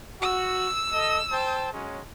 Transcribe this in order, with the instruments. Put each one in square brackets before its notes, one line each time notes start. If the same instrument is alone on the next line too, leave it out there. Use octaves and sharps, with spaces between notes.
[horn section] F#4 [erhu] E6
[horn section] A4 D#5
C5 G5 A5
F#3 G#3 C#4